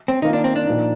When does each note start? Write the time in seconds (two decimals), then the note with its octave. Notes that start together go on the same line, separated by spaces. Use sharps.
0.08 C4
0.22 D#3 A#3 D#4 F4
0.33 D4
0.44 C4
0.56 D4
0.66 A#2 F3 A#3 D#4